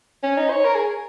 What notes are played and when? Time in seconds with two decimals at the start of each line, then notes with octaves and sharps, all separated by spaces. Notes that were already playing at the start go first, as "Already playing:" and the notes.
0.23 C#4
0.37 D#4
0.51 C#5
0.65 A#4
0.75 G#4